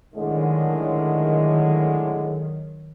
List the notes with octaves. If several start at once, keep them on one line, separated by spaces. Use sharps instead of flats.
A2 D3 D#3 F#3 G#3